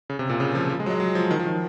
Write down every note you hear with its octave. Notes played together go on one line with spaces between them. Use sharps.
C#3
C3
A#2
C#3
F3
F3
G#3
F#3
G#3
F#3
F3
D#3
F3
D#3